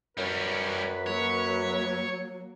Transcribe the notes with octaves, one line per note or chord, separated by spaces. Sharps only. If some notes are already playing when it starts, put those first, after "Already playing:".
F#2 G3 C#4 B4
F#3 A#3 C#5